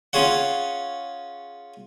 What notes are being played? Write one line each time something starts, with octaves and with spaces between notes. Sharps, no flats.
C#4 F4 G#4 C#5 F#5